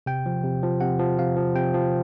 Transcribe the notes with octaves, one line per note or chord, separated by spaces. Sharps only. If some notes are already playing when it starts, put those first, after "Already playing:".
C3 G5
F3
C3
F3
C3 F#5
F3
C3 F5
F3
C3 G5
F3